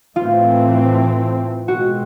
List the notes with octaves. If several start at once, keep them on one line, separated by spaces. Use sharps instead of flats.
A2 E3 A3 C4 F4
B2 G#3 C4 F#4